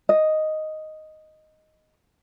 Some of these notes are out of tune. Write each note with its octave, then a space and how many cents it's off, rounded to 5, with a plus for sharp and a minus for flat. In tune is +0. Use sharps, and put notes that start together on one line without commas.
D#5 +0